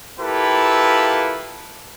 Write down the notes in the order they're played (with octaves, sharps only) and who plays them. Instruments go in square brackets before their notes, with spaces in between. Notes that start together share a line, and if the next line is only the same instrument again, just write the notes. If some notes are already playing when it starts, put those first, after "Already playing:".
[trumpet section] A#3 E4 F4 G4 A4 B4